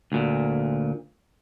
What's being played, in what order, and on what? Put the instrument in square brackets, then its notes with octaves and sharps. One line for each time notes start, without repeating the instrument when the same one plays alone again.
[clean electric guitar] D2 A#2